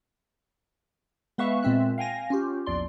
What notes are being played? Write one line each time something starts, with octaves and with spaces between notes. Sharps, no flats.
G#3 B3 B4 E5 F5 C#6
A#2 G#3 C4 E5 F#6
F5 G5 G#5 A#6
C#4 F4 G4
A#1 E2 D5 C6